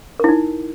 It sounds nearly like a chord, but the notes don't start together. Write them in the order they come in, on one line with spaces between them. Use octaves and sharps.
A#4 E4 D#4